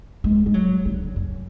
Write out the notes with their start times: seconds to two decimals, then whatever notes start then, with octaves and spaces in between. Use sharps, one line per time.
0.24 G#3
0.46 G#3
0.54 F#3
0.85 D3
1.16 F#2